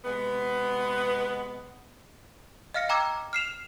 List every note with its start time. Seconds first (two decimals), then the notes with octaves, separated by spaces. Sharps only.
0.04 C3 G#3 B3
2.74 D#5 F5 F6 A#6 C#7
2.89 G5 A#5 D6 E6 G#6
3.33 F6 C7 E7 F7